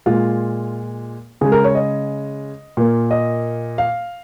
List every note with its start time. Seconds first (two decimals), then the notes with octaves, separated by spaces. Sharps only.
0.06 A#2 G#3 F4
1.41 C#3 G#3 G#4
1.52 A#4
1.64 C#5
1.75 D#5
2.77 A#2 A#3
3.11 D#5
3.78 F5